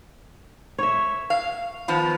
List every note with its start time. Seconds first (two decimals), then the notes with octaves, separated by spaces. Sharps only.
0.78 C#5 E5
1.30 F5
1.88 D#3 F3 B3